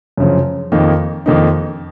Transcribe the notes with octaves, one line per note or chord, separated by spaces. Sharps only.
F#2 C#3 F3
F2 D#3 A#3 D#4
F2 D#3 A#3 D#4